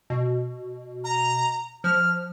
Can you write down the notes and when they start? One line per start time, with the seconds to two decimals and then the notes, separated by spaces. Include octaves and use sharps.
0.10 B2
1.04 A#5
1.84 F3 F6